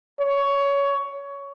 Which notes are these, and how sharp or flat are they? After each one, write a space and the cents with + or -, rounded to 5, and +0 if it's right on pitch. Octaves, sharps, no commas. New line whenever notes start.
C#5 +15